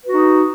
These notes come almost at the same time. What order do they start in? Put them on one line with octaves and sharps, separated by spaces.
B4 F#4 D#4